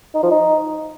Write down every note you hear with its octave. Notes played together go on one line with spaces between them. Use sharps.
D#4
F3
D#4